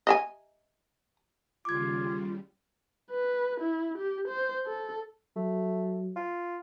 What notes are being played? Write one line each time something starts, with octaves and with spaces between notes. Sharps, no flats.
D#5 E5 G#5
D#2 C#3 G3 F4 D6 G#6
B4
E4
G4
C5
A4
F#3 A3
F4